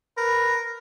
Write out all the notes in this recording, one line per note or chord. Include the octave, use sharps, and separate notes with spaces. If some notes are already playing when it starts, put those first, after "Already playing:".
A#4 B4